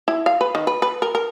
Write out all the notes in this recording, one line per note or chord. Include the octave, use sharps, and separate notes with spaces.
E4
F5
B4
D#3
B4
B4
A#4
A#4